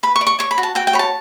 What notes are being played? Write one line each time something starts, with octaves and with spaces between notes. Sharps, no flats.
B4 B5
C#6
D5
C#6
C#5 C#6
B5
F#4
A5
F#4 G5
G5
C#5 B5
A5